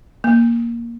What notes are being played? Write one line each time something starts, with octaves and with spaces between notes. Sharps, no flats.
A#3